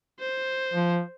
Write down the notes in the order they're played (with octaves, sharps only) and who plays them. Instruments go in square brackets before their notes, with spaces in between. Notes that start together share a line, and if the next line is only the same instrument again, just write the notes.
[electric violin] C5
[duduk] F3